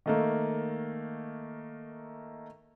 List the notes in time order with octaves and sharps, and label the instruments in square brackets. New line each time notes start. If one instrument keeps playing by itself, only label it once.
[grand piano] D#3 A3 A#3